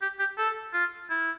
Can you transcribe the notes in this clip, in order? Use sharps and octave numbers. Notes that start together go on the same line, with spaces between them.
G4
G4
A4
F4
E4